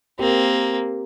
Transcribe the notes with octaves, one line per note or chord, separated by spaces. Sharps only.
A#3 C4 G4 A#4